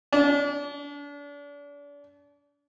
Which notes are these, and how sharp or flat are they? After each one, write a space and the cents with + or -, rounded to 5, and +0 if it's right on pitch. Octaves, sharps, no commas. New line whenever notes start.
D4 -35